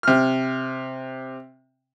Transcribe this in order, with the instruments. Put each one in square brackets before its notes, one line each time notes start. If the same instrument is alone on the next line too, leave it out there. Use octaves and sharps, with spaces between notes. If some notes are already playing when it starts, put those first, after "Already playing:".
[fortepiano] C3 F6